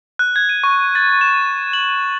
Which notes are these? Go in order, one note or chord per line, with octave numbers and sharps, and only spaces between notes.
F#6
G#6
D#7
C#6
A6
E7
F#7